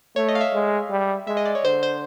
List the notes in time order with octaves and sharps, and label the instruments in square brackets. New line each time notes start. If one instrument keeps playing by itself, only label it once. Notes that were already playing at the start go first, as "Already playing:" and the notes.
[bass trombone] A3 [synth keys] C#5
[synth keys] D#5
F5
E5
[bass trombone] G#3
G3
[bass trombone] G#3 [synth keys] E5
[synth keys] D#5
D5
C#5
[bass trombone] D3 [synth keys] C5
[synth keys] C5